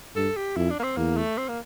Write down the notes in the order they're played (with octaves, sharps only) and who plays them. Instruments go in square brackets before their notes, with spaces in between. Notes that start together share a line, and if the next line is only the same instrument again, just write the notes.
[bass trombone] G2 [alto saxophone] A4
[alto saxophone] G4
[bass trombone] F2 [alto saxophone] E4
[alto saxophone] D4
A#3
C4
[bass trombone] E2 [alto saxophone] A#3
[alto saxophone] A3
C4
A#3